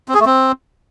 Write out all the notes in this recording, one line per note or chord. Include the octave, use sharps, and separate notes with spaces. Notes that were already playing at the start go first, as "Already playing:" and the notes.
C4
G#4
A3
C4